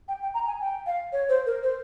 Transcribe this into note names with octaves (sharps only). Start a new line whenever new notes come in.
G5
G5
A#5
G#5
G5
F5
C#5
C5
A#4
C5